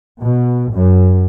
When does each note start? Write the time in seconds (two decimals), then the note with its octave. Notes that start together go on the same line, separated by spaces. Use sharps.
0.21 B2
0.73 F#2